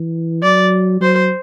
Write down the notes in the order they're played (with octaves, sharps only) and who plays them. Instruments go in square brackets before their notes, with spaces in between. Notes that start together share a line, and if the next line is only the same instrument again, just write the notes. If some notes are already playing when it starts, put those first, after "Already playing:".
Already playing: [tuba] E3
[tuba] F#3 [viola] D5
[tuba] F#3 [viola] C5